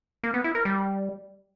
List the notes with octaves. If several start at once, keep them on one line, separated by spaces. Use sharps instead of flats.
A#3
B3
E4
A#4
G3